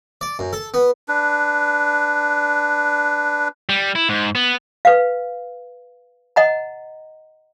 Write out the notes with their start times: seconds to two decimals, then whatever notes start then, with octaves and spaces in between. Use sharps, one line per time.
0.21 D5
0.39 F#2
0.53 A4
0.74 B3
1.08 D4 B4
3.69 G3
3.95 E4
4.09 G#2
4.35 B3
4.85 B4 F5
6.36 D#5 F#5 A#5